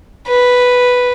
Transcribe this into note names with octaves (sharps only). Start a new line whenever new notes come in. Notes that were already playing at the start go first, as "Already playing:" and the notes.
B4